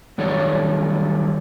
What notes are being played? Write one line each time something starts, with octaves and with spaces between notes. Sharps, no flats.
D#3 F#3 G3 D#4 C#5 D5